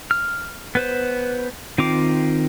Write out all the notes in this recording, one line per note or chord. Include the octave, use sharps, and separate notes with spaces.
F6
B3 B4 C5
D#3 C4 F4 D6